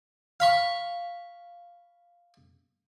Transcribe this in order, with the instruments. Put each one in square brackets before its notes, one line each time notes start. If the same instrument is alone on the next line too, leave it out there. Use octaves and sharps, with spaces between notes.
[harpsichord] F5 B5 C#6